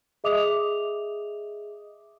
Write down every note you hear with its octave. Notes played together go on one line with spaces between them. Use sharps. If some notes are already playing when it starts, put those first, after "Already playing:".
G#4 D#5 E5 D6 D#6 F7